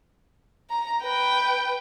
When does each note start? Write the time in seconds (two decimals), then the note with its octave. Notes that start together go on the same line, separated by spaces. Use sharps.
0.70 A#5
1.03 B4 G5